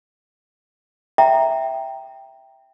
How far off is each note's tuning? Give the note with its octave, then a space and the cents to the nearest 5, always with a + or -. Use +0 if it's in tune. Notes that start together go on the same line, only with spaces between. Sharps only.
E5 +0 G5 +0 A#5 +0